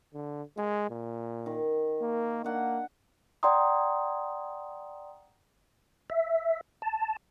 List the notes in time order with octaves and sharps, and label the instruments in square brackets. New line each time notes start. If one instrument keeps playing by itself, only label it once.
[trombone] D3
[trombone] G#3 [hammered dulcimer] G#5
[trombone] A#2
[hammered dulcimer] D#3
[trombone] A#3
[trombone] A#3 [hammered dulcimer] D4 F#5
[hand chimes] D5 F#5 G5 A#5 C6 D#6
[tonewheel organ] E5
A5